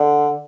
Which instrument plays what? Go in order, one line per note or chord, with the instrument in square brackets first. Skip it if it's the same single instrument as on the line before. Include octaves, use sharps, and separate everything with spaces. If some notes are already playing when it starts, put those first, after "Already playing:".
Already playing: [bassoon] D3